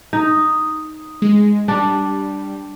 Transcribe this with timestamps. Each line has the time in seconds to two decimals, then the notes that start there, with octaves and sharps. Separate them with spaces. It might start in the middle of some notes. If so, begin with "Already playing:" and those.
0.13 D#4
1.22 G#3
1.68 G3 D4